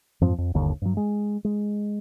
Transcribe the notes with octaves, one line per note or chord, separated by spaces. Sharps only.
F2 G#2 F3 C4
F2
G1 D#2 D3
G2 F#3
G#3
G#3